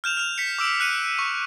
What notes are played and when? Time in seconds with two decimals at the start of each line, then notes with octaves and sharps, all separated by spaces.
0.04 F6 G6 E7 F7
0.17 F6 F7
0.38 B6 C#7
0.59 D6 E6 D7
0.80 F#6 C#7 D#7
1.19 C#6